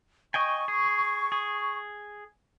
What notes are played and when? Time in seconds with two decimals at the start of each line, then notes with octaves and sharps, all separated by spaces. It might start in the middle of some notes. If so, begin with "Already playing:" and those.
0.34 D#5 G5 G#5 C#6
0.68 G#4
1.32 G#4